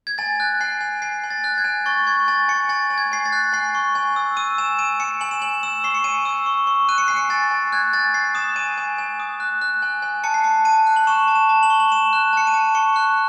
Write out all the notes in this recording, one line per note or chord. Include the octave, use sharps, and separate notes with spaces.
G#6
G#5 A6
F#6
G#5 C7
G#5
G#5 C7
G#5
A6
F#6
G#6
G#5
C#6 A6
C#6 G#6
G#5 A6
G#5 C#7
G#5 A6
G#5
G#6
G#5 C7
A6
F#6
G#5 C7
C#6
G#5
E6
E6 D#7
G#5 E7
G#5 D#7
G#5 C#7
G#5 F#7
E7
G#5 F#7
E6 E7
C#6 C7
C#7
G#5 D#7
E6
C#6
C#6
F#6 D#7
C#7
G#5 C7
C#7
G#5 A6
G#5
F#6 G#6
G#5 A6
G#5 C7
D#6 E7
G#5 D#7
G#5
G#5
D#6
F#6
F#6
G#5
G#5
A5 C#7
C7
A5 C#7
A5 D#7
F#6
F#7
C#6 E7
A5
E7
A5
F#7
C#6
F#7
C#6 E7
F#6
A5 C#7
D#7
A5
C#6 C#7
F#6